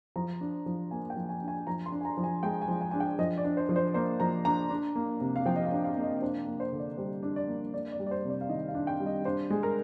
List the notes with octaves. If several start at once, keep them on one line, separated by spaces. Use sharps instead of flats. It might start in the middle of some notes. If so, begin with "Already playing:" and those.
F3 A#5
D4
F3
A#3 G#5
G5
F3
G#5
D4
G#5
F3 A#5
C6
D4
G#5
A#5
F3
G#5
G#3 G5
G#5
F3
G#5
D4 G#5
G5
F3 D#5
D5
D4
C5
F3
C5
A#3 C5
F3 A#5
D4 A#5
D4
A#3
C3
F5
F3 G5
D#5
F5
D4
F5
A#3
D#5
D4 C5
A#3
C5
D3
D5
G3 C5
D4
D5
A#3
D4 D5
D5
G3
D5
C5
C3
D5
F5
D#3 D#5
F5
D4
G5
G3
D#5
D4 C5
G#3
A#4